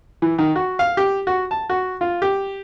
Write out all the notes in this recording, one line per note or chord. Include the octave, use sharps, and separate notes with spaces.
E3
D#3
F#4
F5
G4
F#4
A5
F#4
F4
G4